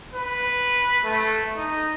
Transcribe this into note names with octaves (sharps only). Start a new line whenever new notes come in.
B4
A3
D#4